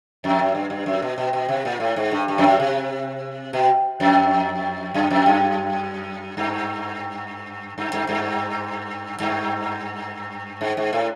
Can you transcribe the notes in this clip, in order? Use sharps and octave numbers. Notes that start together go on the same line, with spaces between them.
F2
F#2
G2
G2
F#2
B2
B2
B2
C3
A#2
A2
G#2
G2
G2
F2
F#2
C3
B2
F2
F#2
F2
F#2
G2
G2
G2
G2
G2
G#2
G#2
A2